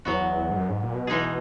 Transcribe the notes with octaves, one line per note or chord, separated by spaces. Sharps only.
E2 F#3 B3 F#4
G#2
F#2
G#2
A#2
B2
E3 G#3 D#4 G#4